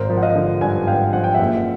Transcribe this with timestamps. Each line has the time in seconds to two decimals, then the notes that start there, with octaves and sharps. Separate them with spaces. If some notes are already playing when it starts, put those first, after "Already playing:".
Already playing: G#1 A#4 C5
0.10 F3
0.18 F#5
0.22 D#5 F5
0.35 D3
0.61 G2 F#5 G#5
0.87 G#1 F5 G5
1.13 F3 F#5
1.24 G5
1.34 F#1 E5 F#5